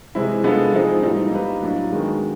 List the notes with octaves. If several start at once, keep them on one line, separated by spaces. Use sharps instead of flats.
C3 E3 G#3 C4 E4
G#3 B3 D4 F4 A4
F3 G#3 C4 D#4
A2 E3 G3 A#3 D#4
A#3 D#4 G4 B4
A2 F#3 A#3 D4
D#3 G#3 B3 D4 F#4